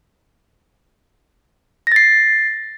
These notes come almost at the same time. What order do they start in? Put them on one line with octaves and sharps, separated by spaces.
A#6 A6 C7